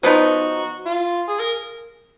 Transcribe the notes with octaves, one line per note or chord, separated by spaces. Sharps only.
F3 B3 D#4 F#4
F4
G#4
A#4